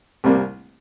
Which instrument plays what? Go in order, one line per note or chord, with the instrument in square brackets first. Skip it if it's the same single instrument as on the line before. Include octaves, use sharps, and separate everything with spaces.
[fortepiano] C2 C3 G3 A#3